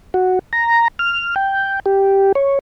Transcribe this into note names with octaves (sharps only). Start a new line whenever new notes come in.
F#4
A#5
F6
G5
G4
C#5